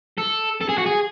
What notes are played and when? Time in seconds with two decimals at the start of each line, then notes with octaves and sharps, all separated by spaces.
0.18 A4
0.61 A4
0.69 G#4
0.78 F#4
0.86 G#4